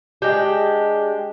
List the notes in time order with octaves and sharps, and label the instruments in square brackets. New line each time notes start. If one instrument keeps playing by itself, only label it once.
[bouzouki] G#3 D4 G4